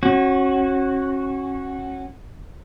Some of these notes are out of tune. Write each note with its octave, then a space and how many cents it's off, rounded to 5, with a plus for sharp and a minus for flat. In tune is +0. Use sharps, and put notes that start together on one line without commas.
C#4 -30 F#4 +0